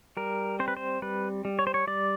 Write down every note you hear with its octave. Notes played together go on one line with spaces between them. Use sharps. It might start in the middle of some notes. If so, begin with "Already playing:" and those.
G3 A#4
C4 C5
B4
C5
G3 B4
G3
C#5
C5
C#5
G3 D5